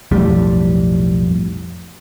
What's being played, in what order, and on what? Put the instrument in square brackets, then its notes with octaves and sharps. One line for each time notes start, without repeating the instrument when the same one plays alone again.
[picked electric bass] B1 F2 A2 G3